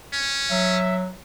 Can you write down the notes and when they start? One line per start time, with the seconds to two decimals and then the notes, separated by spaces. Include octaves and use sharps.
0.13 C#4
0.51 F#3 E5